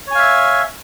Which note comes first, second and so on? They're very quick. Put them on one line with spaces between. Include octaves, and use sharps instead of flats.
C#5 G#5 F5 E5